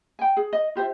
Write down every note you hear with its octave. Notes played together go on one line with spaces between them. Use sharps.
G5 G#5
G#4
D#5
F4 G4 C5 E5